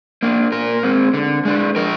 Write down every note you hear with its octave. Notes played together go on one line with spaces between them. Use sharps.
A#3 D4
A#2 A#4
G#3 C4
D3
G#3 D4
F3 A#4